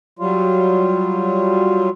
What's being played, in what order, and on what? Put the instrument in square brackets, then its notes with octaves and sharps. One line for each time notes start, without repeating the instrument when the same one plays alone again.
[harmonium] F#3 G3 F4